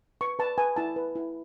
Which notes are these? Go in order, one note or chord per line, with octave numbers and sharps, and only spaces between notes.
B4 C#6
B4 A5
B4 G#5
E4 A5
B4
E4